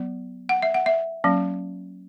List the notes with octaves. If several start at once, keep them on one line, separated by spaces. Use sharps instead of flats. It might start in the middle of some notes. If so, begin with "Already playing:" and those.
Already playing: F#3 B3
F#5
E5
F#5
E5
F#3 A#3 C#4